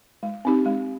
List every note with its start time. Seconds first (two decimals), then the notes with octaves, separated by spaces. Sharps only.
0.23 G#3
0.45 C4 D#4 G4
0.65 G#3